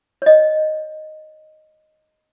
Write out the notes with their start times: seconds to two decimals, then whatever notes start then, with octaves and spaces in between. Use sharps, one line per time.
0.22 C#5 D#5